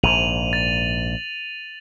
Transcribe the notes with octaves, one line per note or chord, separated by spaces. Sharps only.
A#1 G#2 D#7 F7 F#7
A6